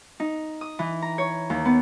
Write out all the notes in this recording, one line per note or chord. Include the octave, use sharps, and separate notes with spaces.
D#4
D#6
E3
A#5
C#5
D#2
B3